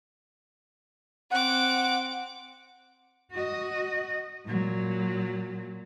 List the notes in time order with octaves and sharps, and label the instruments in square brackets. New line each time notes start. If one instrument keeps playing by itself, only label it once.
[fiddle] C4 D6 [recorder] F#5
[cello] F#4 D#5
A#2 F#3